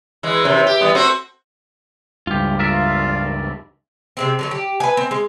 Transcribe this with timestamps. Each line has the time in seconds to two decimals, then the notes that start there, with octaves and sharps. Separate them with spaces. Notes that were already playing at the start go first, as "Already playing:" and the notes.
0.23 E3 G#3
0.44 F#2 C3 E3
0.67 G4
0.81 E3 G3 B3
0.95 A3 C4 F#4
2.27 C#2 G2 F4 G4
2.59 F4 A#4 D5 E5
4.17 C3 G#3 C4
4.39 D3 F#3 C#5
4.51 G4
4.80 B4 G#5
4.97 C4
5.11 G#3